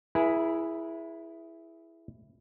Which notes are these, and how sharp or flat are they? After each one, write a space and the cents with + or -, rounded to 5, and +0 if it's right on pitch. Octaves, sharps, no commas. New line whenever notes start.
E4 +5 G#4 +0 B4 -45